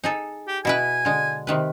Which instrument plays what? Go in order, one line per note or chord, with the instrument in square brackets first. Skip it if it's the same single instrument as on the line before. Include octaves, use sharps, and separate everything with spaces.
[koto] D#4 G#4 A4
[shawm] G4
[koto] B2 E4 B4 [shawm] G#5
[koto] D3 G#3
C3 D#3 B4